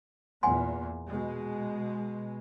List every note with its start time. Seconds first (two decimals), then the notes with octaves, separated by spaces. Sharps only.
0.43 E2 A#2 F#5 G#5 C6
1.08 B2 G#3